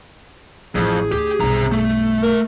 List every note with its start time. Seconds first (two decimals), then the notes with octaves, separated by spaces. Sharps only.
0.75 A1 F2 E4 G#4
1.12 D2 G4
1.40 B1 G2 C3 A#5
1.72 A3
2.23 A#4